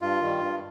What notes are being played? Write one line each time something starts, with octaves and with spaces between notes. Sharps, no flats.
G2 F4
D#3 G3
G2